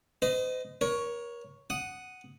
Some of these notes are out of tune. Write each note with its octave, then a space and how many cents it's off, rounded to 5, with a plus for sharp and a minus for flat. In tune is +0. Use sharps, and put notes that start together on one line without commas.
C5 -45 D#5 +0
A#4 +30 C#5 +0
F#5 +0 D#6 +0